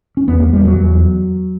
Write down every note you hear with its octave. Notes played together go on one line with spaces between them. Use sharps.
C#4
E2 B3
A#3
E2 G3
F#3
E2